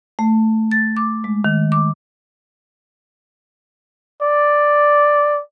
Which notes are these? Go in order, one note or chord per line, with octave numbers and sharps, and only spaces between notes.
A3
A6
D6
G#3
D#3
D6
D5